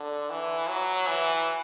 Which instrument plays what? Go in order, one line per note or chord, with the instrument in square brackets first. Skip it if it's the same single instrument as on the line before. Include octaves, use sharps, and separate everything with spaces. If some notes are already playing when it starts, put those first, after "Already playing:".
Already playing: [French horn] D3
E3
F#3
E3